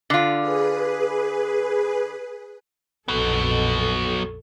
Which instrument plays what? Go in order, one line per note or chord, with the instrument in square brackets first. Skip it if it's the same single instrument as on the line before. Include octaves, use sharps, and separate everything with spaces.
[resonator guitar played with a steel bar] D3 F4
[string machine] G#4 B4
[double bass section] A#1 F2 [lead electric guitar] F#3 B3 [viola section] A4